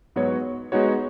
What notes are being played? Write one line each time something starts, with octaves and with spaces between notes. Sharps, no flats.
G#2 F#3 B3 F#4 C#5
G#3 B3 D#4 F#4 C#5